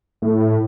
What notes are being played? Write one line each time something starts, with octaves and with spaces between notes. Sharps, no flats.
A2